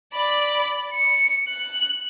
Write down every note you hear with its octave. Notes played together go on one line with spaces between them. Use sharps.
D5 B5
C#7
F#6